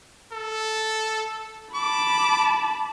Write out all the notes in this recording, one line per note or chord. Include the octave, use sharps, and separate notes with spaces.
A4
A5 B5 D6